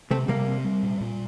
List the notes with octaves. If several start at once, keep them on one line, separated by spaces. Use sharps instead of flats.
C3 A3 C4
C3 G3 A#3
C4
G3
A#2
A#2